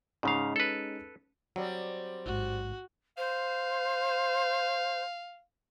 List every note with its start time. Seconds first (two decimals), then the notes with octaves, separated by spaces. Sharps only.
0.23 G#2 C#3 G#3 C#4 D#4 F5
0.56 A4 B4
1.56 F#3 G3 C4
2.26 A1 G#2 F#4
3.17 C5 F5